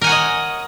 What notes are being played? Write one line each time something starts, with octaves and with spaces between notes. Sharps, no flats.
A#4 C#5 D#5 F#5 G#5